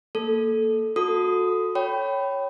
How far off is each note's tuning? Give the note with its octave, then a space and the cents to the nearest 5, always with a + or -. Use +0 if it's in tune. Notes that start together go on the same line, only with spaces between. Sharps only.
A#3 -15 A4 -10
F#4 -25 A4 +0 D#6 +0
C#5 +0 G5 -10 B5 +15